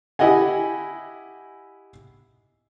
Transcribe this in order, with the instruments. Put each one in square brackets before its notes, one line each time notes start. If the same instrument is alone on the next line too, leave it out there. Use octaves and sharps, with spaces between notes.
[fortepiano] E4 G4 D#5 F#5 G#5